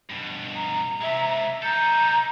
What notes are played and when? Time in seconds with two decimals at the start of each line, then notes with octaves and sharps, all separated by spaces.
0.10 G2 B2
0.55 A#5
1.01 C3 G#3 E5
1.63 D#4 A4 A#5 G6